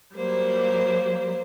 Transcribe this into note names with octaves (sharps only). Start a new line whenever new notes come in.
F#3 G3 A#3 C5